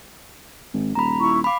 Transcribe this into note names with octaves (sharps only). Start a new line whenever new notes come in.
G#1
D#1 A#5 B5
E4 C#6
F5 B5 D6